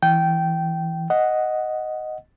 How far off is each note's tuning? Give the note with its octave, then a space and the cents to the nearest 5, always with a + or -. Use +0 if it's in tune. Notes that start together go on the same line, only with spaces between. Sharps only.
E3 +0 G5 -15
D#5 +0 F#5 +0